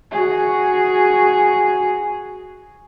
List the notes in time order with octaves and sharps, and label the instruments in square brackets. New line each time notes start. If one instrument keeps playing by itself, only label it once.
[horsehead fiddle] F#4 G#4